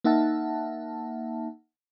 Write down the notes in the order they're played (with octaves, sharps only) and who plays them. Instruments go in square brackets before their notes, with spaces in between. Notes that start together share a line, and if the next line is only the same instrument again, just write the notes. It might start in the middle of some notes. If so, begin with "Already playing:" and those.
[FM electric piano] A#3 D#4 E5 F#5 A5